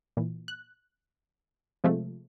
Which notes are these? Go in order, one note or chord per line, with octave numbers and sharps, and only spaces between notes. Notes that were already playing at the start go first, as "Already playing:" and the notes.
A#2 E3
F#6
C3 F3 G#3 A3